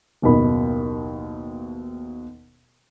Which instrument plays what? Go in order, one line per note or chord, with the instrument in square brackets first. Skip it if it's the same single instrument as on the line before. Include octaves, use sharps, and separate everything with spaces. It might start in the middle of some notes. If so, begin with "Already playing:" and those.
[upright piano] F#1 D#2 B2 B5